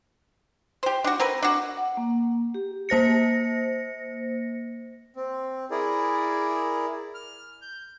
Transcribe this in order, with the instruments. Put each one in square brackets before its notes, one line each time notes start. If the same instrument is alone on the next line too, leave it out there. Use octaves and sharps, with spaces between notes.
[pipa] G4 C5
D4 F#4
C4 A#4 B4
D4 F#4
[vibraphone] F#5
A#3
G4
[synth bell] A#3 C5 A#6 C#7
[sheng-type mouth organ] C4
E4 G#4 A#4 D5
F6
G6